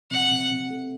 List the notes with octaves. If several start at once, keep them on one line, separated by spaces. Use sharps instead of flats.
C3 F#5
C3
C3
A3